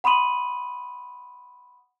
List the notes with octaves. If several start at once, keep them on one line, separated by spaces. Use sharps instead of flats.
F#5 B5 C6 D#6 D#7 F#7